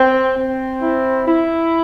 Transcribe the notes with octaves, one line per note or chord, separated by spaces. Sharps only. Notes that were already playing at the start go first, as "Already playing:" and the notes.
Already playing: C4
C4
E4
E4